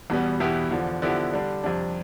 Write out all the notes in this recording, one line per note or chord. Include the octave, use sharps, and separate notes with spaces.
E2 B2 G3 B3
E2 B2 B3 E4 G4
E2 D3 F3
D3 F3 B3 E4 G4
D3 G3 D4
F2 C3 G3 D4